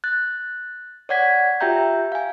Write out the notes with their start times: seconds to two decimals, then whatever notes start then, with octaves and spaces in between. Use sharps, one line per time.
0.04 F#6 A6
1.09 C#5 D5 F#5 G#6 B6
1.60 F4 G4 E5 G5 A#5 G6
2.12 F5 G#5